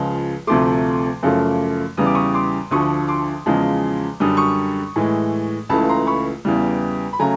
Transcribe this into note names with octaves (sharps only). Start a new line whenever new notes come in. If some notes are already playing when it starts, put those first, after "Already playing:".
Already playing: C#2 C#3 F3 G#3
D2 C3 F3 A3 C6 D6
F#2 C#3 F3 A3
E2 C#3 E3 G3 D#6
D6
C#6 D#6
C6 D6
D2 D3 F3 C#6 D#6
C6 D6
E2 C#3 F3 G#3
F#2 D3 G3 D#6
C#6 D#6
A2 E3 G#3
C#2 C#3 E3 A3 A5 B5
A#5 C6
B5 C#6
E2 C#3 E3 G3
B5
C#3 F#3 A3 G#5 A#5